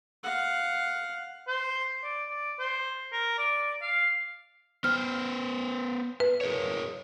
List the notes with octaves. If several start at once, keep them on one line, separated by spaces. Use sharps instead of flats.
F5 F#5
C5
D5
D5
C5
A#4
D5
F5
B3 C5 F6
B4
G#4 A#4 C#5